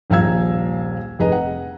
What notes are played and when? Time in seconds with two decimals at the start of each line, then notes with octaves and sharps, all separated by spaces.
0.10 D#1 A#1 F5 A#5 E6 G#6
1.19 F1 G#4 B4 D#5 A#5
1.32 F#5